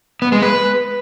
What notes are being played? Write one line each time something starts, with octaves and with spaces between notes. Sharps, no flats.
B3
G#3
B4